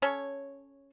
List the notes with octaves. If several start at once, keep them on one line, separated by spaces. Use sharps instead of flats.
C#4 A4 C#5